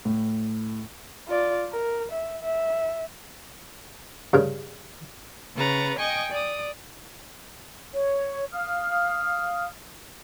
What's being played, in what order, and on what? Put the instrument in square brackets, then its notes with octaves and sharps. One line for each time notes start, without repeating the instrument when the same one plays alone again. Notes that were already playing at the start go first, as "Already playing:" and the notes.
[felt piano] A2
[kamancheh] F4 D5
A#4
E5
E5
[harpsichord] G2 C#3 A#4
[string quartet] C#3 B4 C#5 A#5 A6
D#5 G5 G#5 C#6 D#6
D5 D#6
[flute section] C#5
F5 D#6 F6